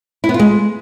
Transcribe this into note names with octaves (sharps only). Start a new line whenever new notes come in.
E4
B3
F4
G#3